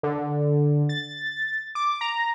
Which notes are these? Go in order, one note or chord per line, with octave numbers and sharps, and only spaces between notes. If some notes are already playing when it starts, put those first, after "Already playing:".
D3
A6
D6
A#5